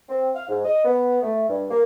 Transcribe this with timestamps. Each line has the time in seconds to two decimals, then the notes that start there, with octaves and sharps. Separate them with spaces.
0.09 C4
0.35 F5
0.49 G#2
0.65 D#5
0.85 B3
1.22 A3
1.48 G2
1.69 A#3